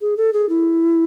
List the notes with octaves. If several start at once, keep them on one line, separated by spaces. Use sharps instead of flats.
G#4
A4
G#4
E4